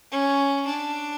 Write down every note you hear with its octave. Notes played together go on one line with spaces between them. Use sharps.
C#4
D4